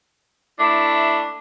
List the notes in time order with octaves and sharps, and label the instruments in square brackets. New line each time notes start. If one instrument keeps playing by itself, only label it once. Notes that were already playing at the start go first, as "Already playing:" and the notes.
[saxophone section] A3 D4 E4